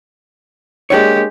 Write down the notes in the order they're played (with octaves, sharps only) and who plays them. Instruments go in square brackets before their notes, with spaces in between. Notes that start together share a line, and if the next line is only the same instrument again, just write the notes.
[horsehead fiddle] G#3 G4 [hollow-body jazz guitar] A#3 D4 C#5